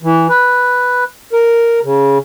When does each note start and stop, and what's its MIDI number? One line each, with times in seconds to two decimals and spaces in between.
0.02 0.27 52
0.29 1.04 71
1.33 1.80 70
1.84 2.18 49